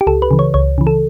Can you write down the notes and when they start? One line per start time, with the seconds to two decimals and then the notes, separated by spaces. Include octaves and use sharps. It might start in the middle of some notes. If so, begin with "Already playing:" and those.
0.01 G4
0.07 C#2 A4
0.22 B4
0.31 C#3 E3
0.39 C#5
0.54 C#2 C#5
0.78 C#3 E3
0.87 A4